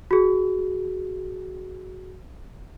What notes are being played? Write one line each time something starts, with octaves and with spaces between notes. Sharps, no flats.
F#4 G#4